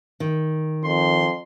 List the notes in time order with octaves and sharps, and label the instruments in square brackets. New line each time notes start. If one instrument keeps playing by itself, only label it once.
[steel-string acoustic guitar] D#3
[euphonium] F2 [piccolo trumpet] C6